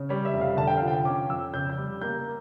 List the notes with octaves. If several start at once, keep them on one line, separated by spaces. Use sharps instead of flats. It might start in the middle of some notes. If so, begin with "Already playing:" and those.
Already playing: C#3
G3 C#5
E5
F1
F5
D3 A5
G5
F3 F5
G5
C#4 D6
F2 E6
C#3 G6
G6
G3
A#3 G6